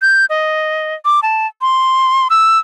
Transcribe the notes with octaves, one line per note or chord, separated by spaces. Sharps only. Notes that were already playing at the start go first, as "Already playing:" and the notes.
G6
D#5
D6
A5
C6
E6